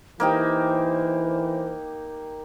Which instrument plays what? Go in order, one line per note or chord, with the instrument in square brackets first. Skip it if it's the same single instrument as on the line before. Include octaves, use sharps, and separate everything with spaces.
[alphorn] E3 [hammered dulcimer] A#3 D#4 G4 [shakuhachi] C5